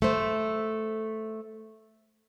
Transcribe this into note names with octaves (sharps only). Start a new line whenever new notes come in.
A3 C5